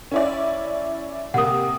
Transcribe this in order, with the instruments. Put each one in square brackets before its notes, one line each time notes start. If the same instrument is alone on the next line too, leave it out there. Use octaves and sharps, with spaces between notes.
[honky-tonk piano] C#4 E4 D5
[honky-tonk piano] C3 A#3 [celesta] F#5 D#6